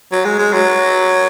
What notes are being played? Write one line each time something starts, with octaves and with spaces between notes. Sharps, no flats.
F#3
G#3
G#3
F#3